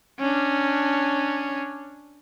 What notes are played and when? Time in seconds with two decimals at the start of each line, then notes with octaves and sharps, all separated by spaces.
0.20 C#4 D4